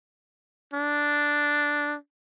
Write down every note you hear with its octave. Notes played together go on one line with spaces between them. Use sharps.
D4